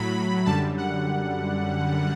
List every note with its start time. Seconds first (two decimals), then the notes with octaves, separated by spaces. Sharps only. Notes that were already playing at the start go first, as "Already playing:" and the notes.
Already playing: A2 F#3 B5
0.46 F#2 D3 G3 A5
0.78 F#5